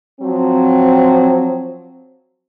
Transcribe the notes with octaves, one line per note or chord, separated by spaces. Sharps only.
F3 F#3 C4